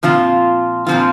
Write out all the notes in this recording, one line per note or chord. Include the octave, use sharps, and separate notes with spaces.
A#2 F3 C4 F4
A#2 F3 C4 F4